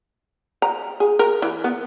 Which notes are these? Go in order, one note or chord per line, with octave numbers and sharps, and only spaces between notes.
A#5
G#4
A#4
E3
B3